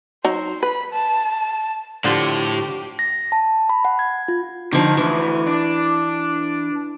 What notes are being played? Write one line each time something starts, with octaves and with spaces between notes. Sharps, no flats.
F#3 D#4 C5
B4 B5
A5
A2 D3 F3 D4 G4
A#6
A5
B5
F#5
G#6
F4
D3 D#3 F3
D2 E3
D4